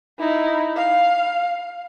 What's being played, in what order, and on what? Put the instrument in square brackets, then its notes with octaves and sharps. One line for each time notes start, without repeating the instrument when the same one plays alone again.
[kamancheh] D#4 E4
F5